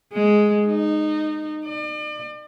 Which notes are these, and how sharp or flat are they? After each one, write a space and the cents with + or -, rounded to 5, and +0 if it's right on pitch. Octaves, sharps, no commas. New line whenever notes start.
G#3 +5
D#4 -20
D5 +40